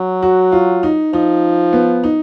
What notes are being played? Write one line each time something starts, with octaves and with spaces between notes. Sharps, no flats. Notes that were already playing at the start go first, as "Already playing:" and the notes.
Already playing: F#3
F#4
F4
D#4
F3 D#4
B3
D#4